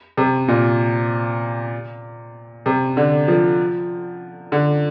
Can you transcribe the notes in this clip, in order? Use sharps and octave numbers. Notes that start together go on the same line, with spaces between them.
C3
A#2
C3
D3
F3
D3